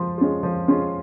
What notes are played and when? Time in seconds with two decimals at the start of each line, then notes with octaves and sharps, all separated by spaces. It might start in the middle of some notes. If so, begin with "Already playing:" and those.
Already playing: F3 G#3 F4
0.18 G#3 C#4 F4
0.43 F3
0.68 G#3 C#4 F4